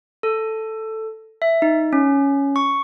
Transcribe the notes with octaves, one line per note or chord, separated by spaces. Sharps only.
A4
E5
D#4
C#4
C#6